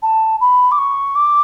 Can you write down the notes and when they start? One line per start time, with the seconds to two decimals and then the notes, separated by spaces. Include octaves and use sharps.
0.03 A5
0.41 B5
0.72 D6
0.78 C#6
1.15 D6